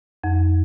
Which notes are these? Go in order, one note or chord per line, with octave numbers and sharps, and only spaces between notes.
F2